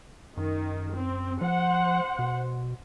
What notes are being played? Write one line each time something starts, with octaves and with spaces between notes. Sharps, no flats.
F#2 D#3
C4
F3 C5 F#5
B2